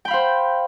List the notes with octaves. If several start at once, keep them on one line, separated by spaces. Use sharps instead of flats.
C5 F5 G5 B5